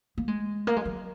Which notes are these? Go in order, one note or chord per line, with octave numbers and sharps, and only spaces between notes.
A#3
G#3
A#3
G#3
F#3